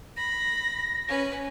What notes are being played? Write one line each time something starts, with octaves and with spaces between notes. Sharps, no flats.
B5 A#6
C#4 B4